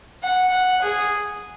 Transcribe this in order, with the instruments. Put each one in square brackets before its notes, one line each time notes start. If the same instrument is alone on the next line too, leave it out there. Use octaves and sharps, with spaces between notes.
[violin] F#5
F#5
G#4